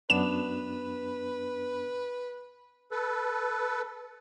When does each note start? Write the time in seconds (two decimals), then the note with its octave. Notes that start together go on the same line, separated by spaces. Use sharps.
0.10 F#2 B3 D4 B4 E7
2.91 A4 B4